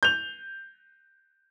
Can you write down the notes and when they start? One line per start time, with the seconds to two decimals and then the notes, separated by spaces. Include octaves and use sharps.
0.03 G6 F7